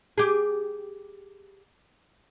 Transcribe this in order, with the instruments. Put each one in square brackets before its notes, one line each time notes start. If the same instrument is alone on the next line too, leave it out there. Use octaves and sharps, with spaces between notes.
[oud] G4 G#4